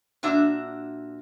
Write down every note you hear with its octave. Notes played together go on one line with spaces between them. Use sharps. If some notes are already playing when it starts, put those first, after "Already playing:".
A#2 D4 F#4 E5